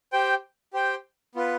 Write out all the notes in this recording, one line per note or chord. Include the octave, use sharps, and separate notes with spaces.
G4 C5 G5
G4 C5 G5
B3 F4 B4